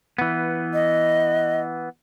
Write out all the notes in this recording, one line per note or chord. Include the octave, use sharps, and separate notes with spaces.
E3 B3
D#5